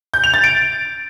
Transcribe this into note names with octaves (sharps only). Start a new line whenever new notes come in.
G6
F7
A6
D7